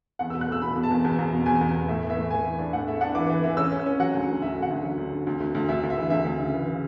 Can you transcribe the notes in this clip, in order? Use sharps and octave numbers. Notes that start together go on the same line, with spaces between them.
E2 F#5
E6
B2
F#6
A3 E6
B2 B5
B2
A5
E2
E2
E2
B2
E2 G#5
E2
E2
A2 E5
E3
E5
A2
E3 G#5
E3
D4
A2 F#5
A3 E5
D4 F#5
E3 D6
E3
E3
C#4 E6
C#4
E6
C#4
F#3 F#5
D2
D2
D2 E5
D3
F#5
D2
F#3
D2
D3
D2
D2
D2
D2 E5
D2
E5
E3
D2 E5
D2
C#3
E3
C#3